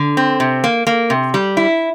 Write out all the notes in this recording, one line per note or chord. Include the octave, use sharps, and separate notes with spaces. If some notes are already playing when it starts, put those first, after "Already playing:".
Already playing: D3
C4
C3
A#3
A#3
C3
G3
E4